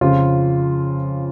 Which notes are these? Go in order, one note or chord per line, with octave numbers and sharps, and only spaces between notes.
F2 C#3 F3 F4